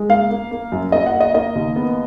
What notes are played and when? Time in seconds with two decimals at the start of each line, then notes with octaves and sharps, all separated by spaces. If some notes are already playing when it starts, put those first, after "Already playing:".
Already playing: G#3
0.10 A#3 F5
0.30 A#3
0.51 A#3
0.72 F#2
0.92 A#3 D#5
1.06 F#5
1.14 A#3
1.20 D#5
1.34 A#3 D#5
1.55 D#2
1.76 B3